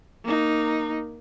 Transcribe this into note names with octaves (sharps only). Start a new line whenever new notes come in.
A#3 D#4